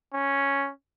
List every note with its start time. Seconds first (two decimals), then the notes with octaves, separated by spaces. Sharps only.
0.14 C#4